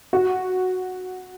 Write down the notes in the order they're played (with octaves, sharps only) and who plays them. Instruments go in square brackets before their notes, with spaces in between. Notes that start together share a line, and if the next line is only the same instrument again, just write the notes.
[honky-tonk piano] F#4